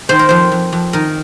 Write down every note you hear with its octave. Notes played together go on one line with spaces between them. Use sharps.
D#3 C5
A#4
F2 C5
F2
F2
D#3 A#4